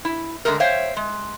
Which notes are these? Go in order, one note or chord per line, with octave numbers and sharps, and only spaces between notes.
E4
D3 G#3 A3 A4 A#4
C5 C#5 E5 F5 G5
G#3